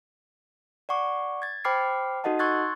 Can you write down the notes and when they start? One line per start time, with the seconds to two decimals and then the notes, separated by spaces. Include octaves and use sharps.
0.89 D5 F#5 C#6 D6
1.42 G#6 A6
1.65 C5 G5 B5 D6 F6 C7
2.24 D#4 F#4 A4 D#5 F#5 A5
2.39 C6 C#6 E6 F#6 G#6 A6